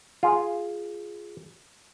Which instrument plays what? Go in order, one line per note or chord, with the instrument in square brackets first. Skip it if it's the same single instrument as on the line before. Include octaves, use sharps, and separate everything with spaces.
[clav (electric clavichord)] F4 G#4